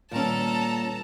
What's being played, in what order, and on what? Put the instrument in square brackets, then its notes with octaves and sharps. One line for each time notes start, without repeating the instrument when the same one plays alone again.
[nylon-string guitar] A#2 C#4 [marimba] D#3 G3 [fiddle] B3 A4 [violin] A5 A#5